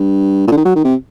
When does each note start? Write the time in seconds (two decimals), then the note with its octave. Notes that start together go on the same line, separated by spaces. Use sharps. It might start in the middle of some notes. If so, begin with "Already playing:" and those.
Already playing: G2
0.47 A#2
0.52 D3
0.57 D#3
0.65 F#3
0.75 D#3
0.84 C3